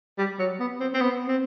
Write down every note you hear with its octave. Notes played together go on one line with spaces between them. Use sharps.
G3
F#3
B3
C4
C4
B3
C4